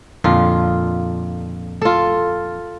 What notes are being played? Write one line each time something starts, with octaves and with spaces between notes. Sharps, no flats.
F2 A#2 D3 F4
F4 A4